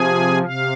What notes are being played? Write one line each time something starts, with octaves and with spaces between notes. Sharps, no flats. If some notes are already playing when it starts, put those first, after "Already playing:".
Already playing: C3 F3 G#4 G#5
C3 F5